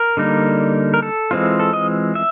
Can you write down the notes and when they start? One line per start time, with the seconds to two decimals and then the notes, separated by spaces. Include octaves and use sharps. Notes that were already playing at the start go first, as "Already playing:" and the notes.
Already playing: A#4
0.17 D3 G3 A#3 D#4
0.94 A#4
1.02 A4
1.31 E3 G#3 C4 F4
1.60 A4
1.73 D#5
2.15 E5